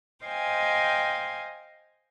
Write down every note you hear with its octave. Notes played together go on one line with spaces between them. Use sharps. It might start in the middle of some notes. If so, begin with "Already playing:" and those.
C5 D#5 F5 G5 G#5